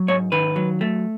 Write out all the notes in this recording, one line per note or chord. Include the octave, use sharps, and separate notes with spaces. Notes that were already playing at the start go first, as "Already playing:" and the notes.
Already playing: F#3
G#2 C#5
D#3 B4
F#3
A3